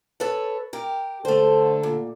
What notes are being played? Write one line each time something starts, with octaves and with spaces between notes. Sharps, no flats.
A4 B4 C#5
G4 A#4
D3 A3 A4 C5
A#2